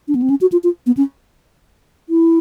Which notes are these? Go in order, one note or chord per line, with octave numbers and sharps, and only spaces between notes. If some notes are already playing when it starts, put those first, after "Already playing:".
D4
B3
C4
C#4
F#4
F4
F4
B3
C#4
E4